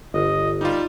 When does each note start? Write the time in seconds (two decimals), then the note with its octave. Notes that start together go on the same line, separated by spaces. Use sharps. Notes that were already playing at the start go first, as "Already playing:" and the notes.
0.14 G1 D#5
0.61 G3 D#4 F4